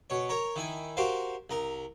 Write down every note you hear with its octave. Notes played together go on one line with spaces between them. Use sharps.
B2 C#5
A#4 C#5 A#5
D#3 E4 G#5
F#4 G4 A#4 C5 F5
C2 A#4 A#5